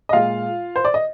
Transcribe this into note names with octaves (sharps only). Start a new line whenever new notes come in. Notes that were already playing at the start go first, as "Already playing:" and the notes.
D#5
A#2 G#3 F4 F5
C5
D5
D#5